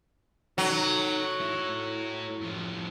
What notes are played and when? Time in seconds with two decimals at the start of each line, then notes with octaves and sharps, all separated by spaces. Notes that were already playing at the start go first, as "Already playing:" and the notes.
0.58 F#3 D#4 A4
1.40 A3 E4
2.41 A2 F3